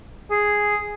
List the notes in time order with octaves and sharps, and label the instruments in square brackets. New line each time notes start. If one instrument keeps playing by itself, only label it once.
[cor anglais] G#4